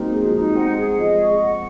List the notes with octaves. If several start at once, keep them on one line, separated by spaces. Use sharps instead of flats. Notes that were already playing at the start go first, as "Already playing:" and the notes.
Already playing: F#3 G#3 A#3 C4 D#4
G#3 G#4
F#3
F3
F#3 D#4
G#3 C4 F#5
G#4
F3 G#3 D#5
C#6
F#5